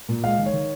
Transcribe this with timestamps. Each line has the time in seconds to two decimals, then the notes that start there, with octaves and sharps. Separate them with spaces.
0.09 A#2
0.24 G#3 F5
0.38 D#3
0.46 C#5
0.53 D#3